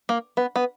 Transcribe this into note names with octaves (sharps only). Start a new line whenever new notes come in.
A#3
B3
B3